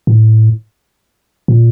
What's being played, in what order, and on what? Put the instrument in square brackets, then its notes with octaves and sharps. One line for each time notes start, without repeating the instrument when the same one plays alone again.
[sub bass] A2
A#2